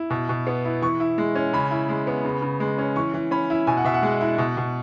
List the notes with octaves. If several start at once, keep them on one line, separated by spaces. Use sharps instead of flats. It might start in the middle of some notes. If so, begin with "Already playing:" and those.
Already playing: E4
B2
B2
B3
E4
E3 C#6
E4
G#3
C#4
C#3 B5
E4
G#3
B3
C#3
C#3
G#3
C#4
E3 C#6
E3
C#4 B5
E4
B2 G#5
F#5
B2 E5
F#5
G#3
E4
B2
B2